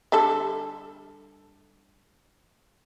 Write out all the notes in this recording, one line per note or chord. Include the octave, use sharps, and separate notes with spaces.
D3 G3 A4